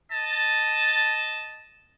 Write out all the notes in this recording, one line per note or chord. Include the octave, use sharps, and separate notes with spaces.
D#5 A5